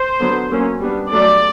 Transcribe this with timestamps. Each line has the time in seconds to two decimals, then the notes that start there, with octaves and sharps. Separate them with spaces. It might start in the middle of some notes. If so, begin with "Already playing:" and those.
Already playing: C5
0.20 D3 F#3 B3
0.50 F#3 A#3 C#4
0.81 G3 B3 D4
1.11 F#3 A3 D4 D5